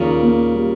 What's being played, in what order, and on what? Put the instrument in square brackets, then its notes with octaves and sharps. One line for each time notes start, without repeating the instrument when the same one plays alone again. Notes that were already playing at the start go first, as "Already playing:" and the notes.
Already playing: [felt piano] D#2 [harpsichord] A#2 C#3
[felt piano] A#3
G3